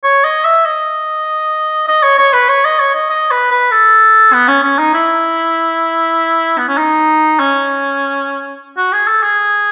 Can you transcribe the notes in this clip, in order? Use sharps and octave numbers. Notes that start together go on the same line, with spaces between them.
C#5
D#5
E5
D#5
D#5
C#5
C#5
B4
C#5
D#5
C#5
D#5
D#5
B4
B4
A4
B3
C#4
C#4
D#4
E4
B3
C#4
D#4
C#4
F#4
G#4
A4
G#4